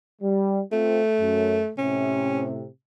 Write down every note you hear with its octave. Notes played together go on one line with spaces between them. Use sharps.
G3
A3 C4 F4
F#2
A2 C3 C#4